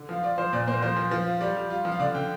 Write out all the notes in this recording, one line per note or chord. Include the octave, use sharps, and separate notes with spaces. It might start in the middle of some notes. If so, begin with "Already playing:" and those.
Already playing: D3
F3 F5
F4 D5
F3 C5
A#2 D5
A#3 C5
F3 C5
F3
F3
F4
G3 D5
G3
F4
F3
F5
D3 D5
D3 G5